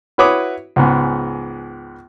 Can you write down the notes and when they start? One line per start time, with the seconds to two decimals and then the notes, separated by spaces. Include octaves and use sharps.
0.18 E4 F#4 B4 C#5 D6 D#6
0.76 C#2 G#2 B3